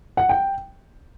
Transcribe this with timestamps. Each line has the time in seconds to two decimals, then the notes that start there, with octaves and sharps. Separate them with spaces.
0.17 F#5
0.29 G5